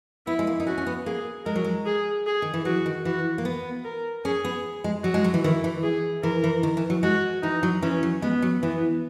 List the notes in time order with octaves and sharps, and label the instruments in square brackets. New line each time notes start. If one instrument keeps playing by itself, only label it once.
[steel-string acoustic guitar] B3 [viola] E4
[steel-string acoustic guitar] G#3
A#3
D#4
[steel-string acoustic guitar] C#4 [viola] F#4
[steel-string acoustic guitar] C#4
B3
[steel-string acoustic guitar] A#3 [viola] G#4
[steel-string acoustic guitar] G#3 [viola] A#4
[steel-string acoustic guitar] F#3
G#3
[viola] G#4
G#4
[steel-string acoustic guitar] D#3
E3
[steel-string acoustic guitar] F#3 [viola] F#4
[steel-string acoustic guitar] D#3
[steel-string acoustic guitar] E3 [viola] F#4
[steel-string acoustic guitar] A#3
B3
[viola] A#4
[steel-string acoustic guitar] C#4 [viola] G#4
[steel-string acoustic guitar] B3
G#3
[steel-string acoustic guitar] F#3 [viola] F#4
[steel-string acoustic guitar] G#3
F#3
E3
[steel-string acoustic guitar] D#3 [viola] E4
[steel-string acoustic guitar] E3
[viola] G#4
[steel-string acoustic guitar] E3 [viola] A#4
[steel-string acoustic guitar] E3
D#3
E3
F#3
[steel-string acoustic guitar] G#3 [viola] F#4
[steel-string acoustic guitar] E3 [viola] D#4
[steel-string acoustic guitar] F#3
[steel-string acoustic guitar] E3 [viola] C#4
[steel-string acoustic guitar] F#3
[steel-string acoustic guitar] G#3 [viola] B3
[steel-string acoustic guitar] F#3
[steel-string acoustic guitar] E3 [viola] B3